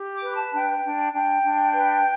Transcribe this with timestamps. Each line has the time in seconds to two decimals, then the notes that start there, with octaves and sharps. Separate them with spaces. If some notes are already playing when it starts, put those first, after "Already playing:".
Already playing: G4
0.13 D6
0.23 B4
0.33 A5
0.52 D4 G5
0.83 D4
1.13 D4 G5
1.43 D4
1.74 B4